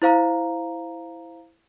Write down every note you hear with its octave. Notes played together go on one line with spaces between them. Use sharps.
E4 C5 F5 A#5